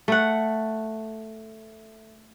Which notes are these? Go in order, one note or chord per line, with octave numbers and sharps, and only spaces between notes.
A3 F#5